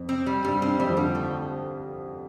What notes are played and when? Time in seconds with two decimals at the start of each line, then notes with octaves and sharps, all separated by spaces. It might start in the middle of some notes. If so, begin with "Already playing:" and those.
Already playing: F2
0.09 C4
0.26 G3
0.44 G2 G3
0.62 G2 C4
0.79 F2 G3
0.90 F3
0.97 D3 G3
1.15 A3